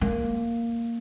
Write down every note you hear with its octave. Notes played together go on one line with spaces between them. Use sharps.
A#3